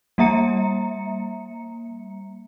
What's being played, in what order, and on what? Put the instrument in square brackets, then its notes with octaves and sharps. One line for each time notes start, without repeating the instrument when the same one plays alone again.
[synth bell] G3 A#3 E5 A#5 C#7